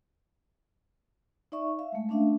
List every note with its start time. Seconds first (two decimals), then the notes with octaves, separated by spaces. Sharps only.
1.52 D#4 D5 E5 C#6
1.79 E5 F5
1.92 G#3 A3
2.09 A3 C#4 D4 E5 F5